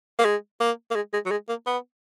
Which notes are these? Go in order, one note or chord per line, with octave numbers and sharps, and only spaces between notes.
A#3
G#3
A#3
A#3
G#3
G#3
F#3
G#3
A#3
B3